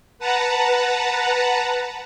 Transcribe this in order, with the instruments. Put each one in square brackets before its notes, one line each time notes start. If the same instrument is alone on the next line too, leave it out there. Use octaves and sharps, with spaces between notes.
[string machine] B4 F#5 A5 A#5